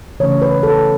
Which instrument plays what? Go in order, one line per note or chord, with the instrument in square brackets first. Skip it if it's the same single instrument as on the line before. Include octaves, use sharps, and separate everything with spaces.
[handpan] C#3 E3 A3 C#4 C#5
B4
A4